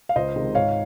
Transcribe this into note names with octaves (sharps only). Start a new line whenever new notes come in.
F5
C#2 C5 D#5
C3 D#3 G#3
G#2 C#5 F5